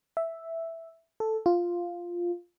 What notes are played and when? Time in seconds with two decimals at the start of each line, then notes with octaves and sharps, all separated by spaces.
0.17 E5
1.20 A4
1.46 F4